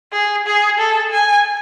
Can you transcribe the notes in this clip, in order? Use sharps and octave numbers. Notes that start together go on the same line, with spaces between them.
G#4
G#4
A4
G#5